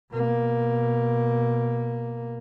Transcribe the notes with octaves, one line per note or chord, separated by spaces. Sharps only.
B2 A#3